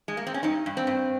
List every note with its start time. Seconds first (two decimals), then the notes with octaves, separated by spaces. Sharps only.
0.08 G#3
0.17 A#3
0.27 C4
0.34 C#4
0.43 G2 D#4
0.66 G2
0.77 C4
0.87 G2